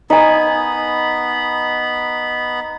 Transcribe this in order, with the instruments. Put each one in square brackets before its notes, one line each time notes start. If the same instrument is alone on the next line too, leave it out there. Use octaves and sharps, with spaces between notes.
[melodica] B3 B5 [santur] D#4 G#5